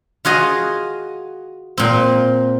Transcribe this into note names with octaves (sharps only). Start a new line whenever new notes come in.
F4 F#4 G#4 D#5
A#2 C4